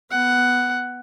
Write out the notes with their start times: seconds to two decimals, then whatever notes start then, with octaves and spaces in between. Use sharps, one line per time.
0.11 B3 F#5